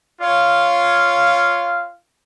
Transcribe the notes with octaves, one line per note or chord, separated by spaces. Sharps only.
F4 C#5 F5